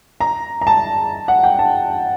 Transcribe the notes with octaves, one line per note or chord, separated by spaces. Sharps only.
A#5
A#5
A5
F#5
G5
A5